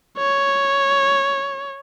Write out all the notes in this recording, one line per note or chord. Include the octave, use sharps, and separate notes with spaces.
C#5